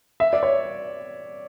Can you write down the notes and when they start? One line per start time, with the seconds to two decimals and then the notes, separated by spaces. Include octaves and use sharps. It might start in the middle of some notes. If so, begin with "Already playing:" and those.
0.20 E5
0.33 D5
0.43 C#5